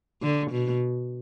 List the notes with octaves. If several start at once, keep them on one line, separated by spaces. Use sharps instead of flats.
D3
B2